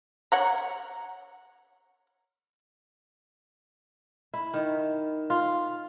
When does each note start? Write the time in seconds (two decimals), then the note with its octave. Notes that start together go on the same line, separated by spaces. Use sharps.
0.32 C#5 F#5 A#5
4.34 E4
4.54 D#3
5.30 F4